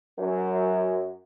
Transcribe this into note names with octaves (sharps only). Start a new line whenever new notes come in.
F#2